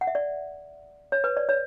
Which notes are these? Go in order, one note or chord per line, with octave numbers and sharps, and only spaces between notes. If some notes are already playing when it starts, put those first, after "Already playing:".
F#5
E5
D5
C#5
B4
D5
C#5